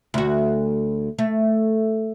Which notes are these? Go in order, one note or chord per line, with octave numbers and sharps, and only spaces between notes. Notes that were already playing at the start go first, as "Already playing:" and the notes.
D2 F#4
A3